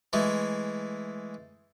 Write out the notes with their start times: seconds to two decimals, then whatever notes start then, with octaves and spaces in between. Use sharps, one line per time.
0.13 E3 G#3 A3